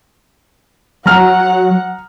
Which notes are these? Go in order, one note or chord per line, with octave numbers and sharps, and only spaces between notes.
F#3 F#5 A#5 F6